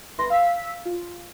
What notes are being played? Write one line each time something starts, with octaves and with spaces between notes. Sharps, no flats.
G1 E4 B4 C6 A#6
F5 E6 B6
F4